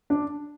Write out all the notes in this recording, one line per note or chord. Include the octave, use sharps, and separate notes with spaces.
D4